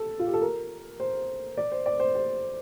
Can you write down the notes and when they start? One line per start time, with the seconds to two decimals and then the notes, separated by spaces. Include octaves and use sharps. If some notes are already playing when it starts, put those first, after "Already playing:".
Already playing: A4
0.19 F4
0.26 G4
0.34 A4
0.41 A#4
1.00 C5
1.57 D5
1.72 C5
1.86 D5
2.00 C5
2.15 C5